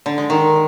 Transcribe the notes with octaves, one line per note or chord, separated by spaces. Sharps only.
D3
G#3
D#3